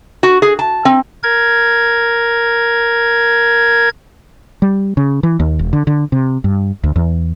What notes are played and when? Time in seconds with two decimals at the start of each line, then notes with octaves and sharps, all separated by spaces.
0.23 F#4
0.42 G#4
0.59 A5
0.85 C4
1.23 A#4 G#6
4.62 G3
4.97 C#3
5.23 E3
5.40 D#2
5.59 E1
5.73 D3
5.87 D3
6.12 C3
6.44 G2
6.83 D2
6.96 E2